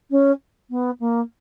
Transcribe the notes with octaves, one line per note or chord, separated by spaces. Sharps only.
C#4
B3
A#3